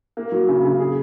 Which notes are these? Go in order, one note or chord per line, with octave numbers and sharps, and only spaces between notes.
A#3
F#3
C#3
C#3
G#4